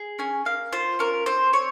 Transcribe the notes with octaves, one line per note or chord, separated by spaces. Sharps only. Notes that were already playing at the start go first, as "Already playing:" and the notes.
Already playing: G#4
C#4 G#5
A#3 F5
F4 C5
C#4 A#4
C4 C5
C4 C#5